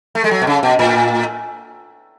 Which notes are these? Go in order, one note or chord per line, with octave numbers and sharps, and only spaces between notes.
A3
G#3
F#3
B2
C#3
B2
A2